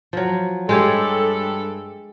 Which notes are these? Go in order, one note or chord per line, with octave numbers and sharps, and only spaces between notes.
F3 F#3
G2 G#3 G4 A4 C#5